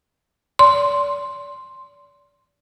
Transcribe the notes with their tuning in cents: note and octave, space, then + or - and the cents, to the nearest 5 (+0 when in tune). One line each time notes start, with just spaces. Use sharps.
D5 -35 C6 +0